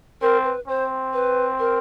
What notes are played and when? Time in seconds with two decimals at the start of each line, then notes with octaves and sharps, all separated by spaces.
0.22 C4 A#4
0.44 B4
0.68 C4 C5
1.14 B4
1.59 A#4